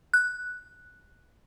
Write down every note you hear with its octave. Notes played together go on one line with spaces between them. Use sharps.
F#6